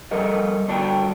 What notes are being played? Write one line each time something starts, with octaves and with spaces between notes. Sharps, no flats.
F3 G3 A4 A#4 D#5
G2 D3 D4 F#4 D5 G5